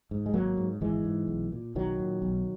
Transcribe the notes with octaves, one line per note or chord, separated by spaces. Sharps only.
G#2
G#3
G#1 F#3 A#3
G#2
G#1 E3 G#3
G#2
B1
A#2
B1 D#3 F#3
A#2
B1